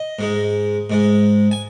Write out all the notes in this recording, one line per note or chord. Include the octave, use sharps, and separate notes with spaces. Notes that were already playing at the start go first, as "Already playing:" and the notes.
Already playing: D#5
G#2 G#3
G#2 G#3
G#5